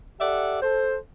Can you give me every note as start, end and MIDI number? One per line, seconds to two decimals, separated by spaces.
0.20 0.62 67
0.20 0.62 69
0.20 0.62 74
0.20 0.62 76
0.20 0.62 78
0.62 0.96 69
0.62 0.96 72